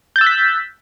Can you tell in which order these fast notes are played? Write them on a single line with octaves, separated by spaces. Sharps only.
G6 A6 E6 F#6 B6